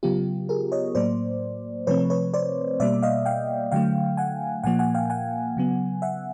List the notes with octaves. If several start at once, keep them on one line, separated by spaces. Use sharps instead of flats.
C#3 F#3 B3 F4 G4
G#4 A#4
C#5 D#5
A2 F#3 A#3 C5 D5
C3 F3 A3 C4 B4 C#5
B4 C#5
C5 D5
B2 G3 A#3 D5 E5
D#5 F5
F5 G5
D3 F#3 A3 F5 G5
F#5 G#5
A#2 F3 A#3 F#5 G#5
F#5 G#5
F5 G5
F#5 G#5
C#3 F#3 B3
E5 F#5